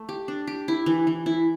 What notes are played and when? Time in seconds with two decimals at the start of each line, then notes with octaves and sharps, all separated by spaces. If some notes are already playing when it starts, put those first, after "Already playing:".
Already playing: A3
0.09 G4
0.28 D4
0.47 G4
0.68 E4
0.86 E3
1.07 E3
1.26 E4